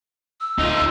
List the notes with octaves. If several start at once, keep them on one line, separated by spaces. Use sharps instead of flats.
E6
D2 D#4 F4